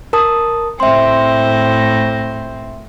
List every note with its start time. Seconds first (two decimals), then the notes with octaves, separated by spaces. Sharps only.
0.13 A#4 A5 D#6
0.80 A2 C4 E5 C6